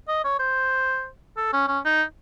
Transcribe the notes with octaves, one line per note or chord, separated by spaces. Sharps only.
D#5
C#5
C5
A4
C#4
C#4
D#4